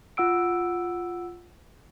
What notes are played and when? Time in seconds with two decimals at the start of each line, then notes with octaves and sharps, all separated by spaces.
0.17 F4 F#5 E6 D7